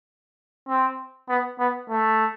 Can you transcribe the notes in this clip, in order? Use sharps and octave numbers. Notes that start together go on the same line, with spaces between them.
C4
B3
B3
A3